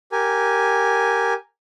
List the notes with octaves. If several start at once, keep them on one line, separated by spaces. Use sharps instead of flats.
G4 A#4 G#5